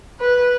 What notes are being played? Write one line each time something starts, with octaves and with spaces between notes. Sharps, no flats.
B4